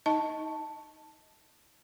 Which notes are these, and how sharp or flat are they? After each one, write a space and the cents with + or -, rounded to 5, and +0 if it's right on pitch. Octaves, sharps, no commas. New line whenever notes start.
D#4 +20 D#5 +20 A5 +5